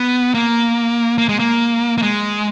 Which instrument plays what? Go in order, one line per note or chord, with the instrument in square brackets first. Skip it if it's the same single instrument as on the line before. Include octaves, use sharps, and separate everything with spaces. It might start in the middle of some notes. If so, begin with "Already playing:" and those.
Already playing: [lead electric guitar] B3
A#3
A#3
G#3
A#3
A#3
G#3